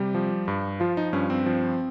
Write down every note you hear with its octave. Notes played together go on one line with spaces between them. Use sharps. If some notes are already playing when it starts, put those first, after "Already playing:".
Already playing: C3 G3 G4
F3
G2
F3 F4
D#4
G2 C#4
C4
F3